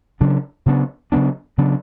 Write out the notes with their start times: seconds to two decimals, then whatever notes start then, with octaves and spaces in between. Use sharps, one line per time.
0.20 C#3 F#3 B3 D4
0.66 C#3 F#3 B3 D4
1.12 C#3 F#3 B3 D4
1.58 C#3 F#3 B3 D4